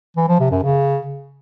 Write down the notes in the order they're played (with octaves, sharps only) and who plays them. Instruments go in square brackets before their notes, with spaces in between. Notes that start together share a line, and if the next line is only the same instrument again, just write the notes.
[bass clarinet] E3
F3
C3
F#2
C#3